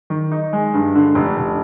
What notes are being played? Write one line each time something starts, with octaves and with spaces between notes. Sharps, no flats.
D#3
D#4
G#3
G2
D3
F1
F1